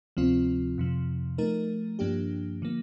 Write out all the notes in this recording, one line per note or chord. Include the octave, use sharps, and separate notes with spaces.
D2 C3 F3 C4 F4
F2 C3 F3
F3 A3 D#4 A#4
G2 F3 A#3 D4 G4
D3 F3 A#3